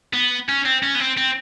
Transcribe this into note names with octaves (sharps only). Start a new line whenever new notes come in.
B3
C#4
C4
C#4
B3
C4
C4